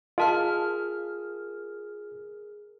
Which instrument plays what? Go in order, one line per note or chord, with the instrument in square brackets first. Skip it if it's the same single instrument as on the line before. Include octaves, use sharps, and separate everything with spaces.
[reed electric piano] F4 [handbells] G#4 A#4 F6 [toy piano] D#5 A5